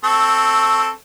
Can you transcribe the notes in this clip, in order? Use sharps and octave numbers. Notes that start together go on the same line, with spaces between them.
C4 A4 C#6